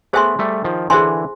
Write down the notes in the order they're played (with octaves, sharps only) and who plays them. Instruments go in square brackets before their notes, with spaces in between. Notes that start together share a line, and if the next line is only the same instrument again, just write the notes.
[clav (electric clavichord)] A3 B3 [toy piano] G#4 C5 E5 G#5 C6
[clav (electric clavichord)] G3 A3
D#3 F3
[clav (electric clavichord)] D3 E3 [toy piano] G#4 C5 E5 G#5 C6